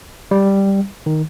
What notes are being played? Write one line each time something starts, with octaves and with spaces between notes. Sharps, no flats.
G3
D#3